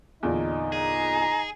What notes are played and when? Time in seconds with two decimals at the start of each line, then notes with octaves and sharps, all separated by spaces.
0.23 E2 A#2 D3 D#4
0.72 G#4 A#5